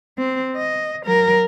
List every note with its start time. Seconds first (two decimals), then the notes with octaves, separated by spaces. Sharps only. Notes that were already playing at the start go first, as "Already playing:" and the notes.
0.18 C4
0.56 D#5
1.06 F#3 A#4